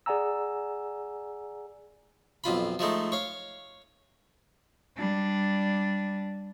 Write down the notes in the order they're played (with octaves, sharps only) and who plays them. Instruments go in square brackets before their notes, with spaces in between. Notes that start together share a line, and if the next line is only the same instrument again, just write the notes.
[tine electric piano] G#4 D5 F#5 G#5 A#5 E6
[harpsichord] B1 F2 F4 B5
F3 G#3 A3 D#4
C#5 F5
[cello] G3 D4